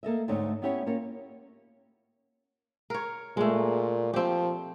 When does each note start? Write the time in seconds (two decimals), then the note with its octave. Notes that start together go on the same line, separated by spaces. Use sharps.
0.03 A#3 A4 D#5 E5
0.28 D2 G#2 A3 C4 D#4 C#5
0.62 B3 C#4 E4 G4 A#4 C#5
0.86 A#3 C#4 F4 C#5
2.90 A#4 C#5
3.37 A#2 G#3 A3
4.14 F3 C4 G4